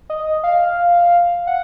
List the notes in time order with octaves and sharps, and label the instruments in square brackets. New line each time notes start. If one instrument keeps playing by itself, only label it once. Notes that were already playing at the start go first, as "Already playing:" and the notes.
[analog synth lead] D#5
F5
F#5